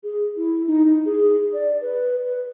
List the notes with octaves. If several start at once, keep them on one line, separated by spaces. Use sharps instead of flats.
G#4
E4
D#4
D#4
G#4
D5
B4
B4